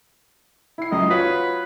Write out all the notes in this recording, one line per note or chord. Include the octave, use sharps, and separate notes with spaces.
E4 C7
C#2 F#2 D#5
F4 F#4 B4 C#5